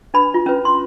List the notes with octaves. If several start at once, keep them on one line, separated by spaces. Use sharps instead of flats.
D4 B4 B5
F4
C#4 B4
C6